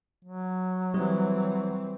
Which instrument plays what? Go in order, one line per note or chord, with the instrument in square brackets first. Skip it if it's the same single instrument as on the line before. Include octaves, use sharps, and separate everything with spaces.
[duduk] F#3
[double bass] E3 C4 [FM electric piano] G3